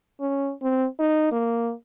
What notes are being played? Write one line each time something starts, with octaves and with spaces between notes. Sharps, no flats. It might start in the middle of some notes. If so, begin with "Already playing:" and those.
C#4
C4
D#4
A#3